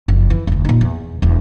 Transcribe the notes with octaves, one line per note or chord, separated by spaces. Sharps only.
F#1 F2
E3
F1 D2
A#2 D#4
E2
E1 E2